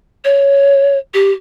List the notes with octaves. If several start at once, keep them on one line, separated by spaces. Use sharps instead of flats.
C#5
G4